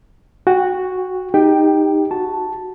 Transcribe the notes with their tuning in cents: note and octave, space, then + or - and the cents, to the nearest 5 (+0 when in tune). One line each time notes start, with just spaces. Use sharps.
F#4 +0 G5 +25
D#4 +0 G4 +20 G5 +0
F#4 +0 A5 +0